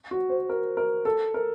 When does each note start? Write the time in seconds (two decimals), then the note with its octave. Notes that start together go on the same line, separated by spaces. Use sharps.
0.11 F#4
0.29 C5
0.49 A#4
0.77 A#4
1.05 A4
1.34 A#4